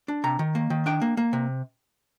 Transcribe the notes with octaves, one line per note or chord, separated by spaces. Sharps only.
D4
C3 A#5
D#3
A#3
D#3
D4 G5
A#3
A#3
C3